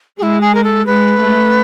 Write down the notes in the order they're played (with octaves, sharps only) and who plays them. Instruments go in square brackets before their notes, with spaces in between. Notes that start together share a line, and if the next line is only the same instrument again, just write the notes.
[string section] G#3 [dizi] G#4
[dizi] E4
G#4
A#4
A4
[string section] G#3 [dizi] B4
[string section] A3